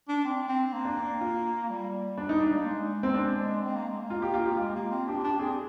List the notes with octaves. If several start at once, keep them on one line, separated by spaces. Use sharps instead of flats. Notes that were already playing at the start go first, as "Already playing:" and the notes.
D4
C4
C4
A#3
D4
F4
G3
D4
D#4
D4
A#3
G#3
C4
D4
C4
A#3
G#3
A#3
F4
G4
F4
G4
G#3 F4
A#3
C4
D4 G4
D4 G4
C4 G#4